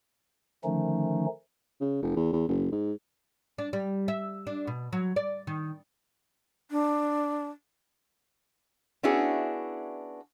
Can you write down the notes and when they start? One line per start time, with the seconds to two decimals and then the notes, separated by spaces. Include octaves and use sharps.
0.64 D3 D#3 F3 A3 C#4 D#4
1.81 C#3
2.02 F1
2.16 E2
2.33 E2
2.48 F#1
2.72 G#2
3.58 D4
3.73 G3
4.08 E5
4.47 D4
4.67 B2
4.93 F#3
5.16 D5
5.47 D#3
6.71 D4
9.03 B3 C#4 D4 E4 F#4 G#4